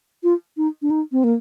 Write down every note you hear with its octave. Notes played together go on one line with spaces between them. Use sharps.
F4
D#4
D4
D#4
C4
A#3